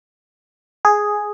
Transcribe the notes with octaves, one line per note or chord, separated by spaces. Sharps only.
G#4